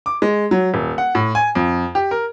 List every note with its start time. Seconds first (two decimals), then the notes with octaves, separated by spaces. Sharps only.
0.06 D6
0.22 G#3
0.51 F#3
0.74 D#1
0.98 F#5
1.15 A2
1.35 G#5
1.55 F2
1.95 G4
2.11 A#4